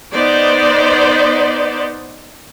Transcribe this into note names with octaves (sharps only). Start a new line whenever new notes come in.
B3 D#4 C5 D5